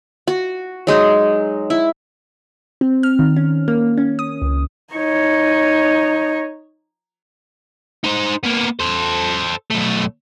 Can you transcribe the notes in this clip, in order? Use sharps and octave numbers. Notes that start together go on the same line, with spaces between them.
F#4
F#3 G#3 D#4
E4
C4
F6
D#3
C#4
A#3
C#4
D#6
C#2
D#4 C#5
D#4 C5
A#3 B3
A4 C5
B1 A3